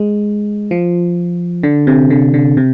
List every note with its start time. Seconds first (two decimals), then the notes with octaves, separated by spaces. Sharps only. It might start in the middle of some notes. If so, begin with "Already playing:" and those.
Already playing: G#3
0.71 F3
1.63 D3
1.87 C3
2.10 D3
2.34 D3
2.57 C3